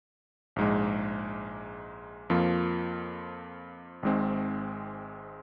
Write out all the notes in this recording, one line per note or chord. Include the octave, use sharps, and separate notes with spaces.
A#1 G#2 G#3
F2 F3 A#3 F4
G#1 G#2 G#3 C4